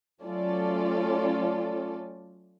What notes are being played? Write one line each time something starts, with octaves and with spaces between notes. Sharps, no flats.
F#3 A3 C#4 F4 A4 D5